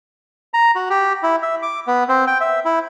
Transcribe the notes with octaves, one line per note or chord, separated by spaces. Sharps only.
A#5
F#4
G4
E4
E5
D6
B3
C4
G5
E5
E4